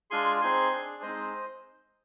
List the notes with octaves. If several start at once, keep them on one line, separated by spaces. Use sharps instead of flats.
G#3 D4 F4 G#4 G#5 C6
C4 D#4 G#4 G#5 C6
D4 G#4
G#3 C4 D#4 C5 D#5